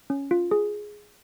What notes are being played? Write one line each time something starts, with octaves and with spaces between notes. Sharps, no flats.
C#4
F4
G#4